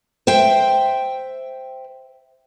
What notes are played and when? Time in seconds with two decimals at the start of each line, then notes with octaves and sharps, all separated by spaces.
0.27 C5 E5 G5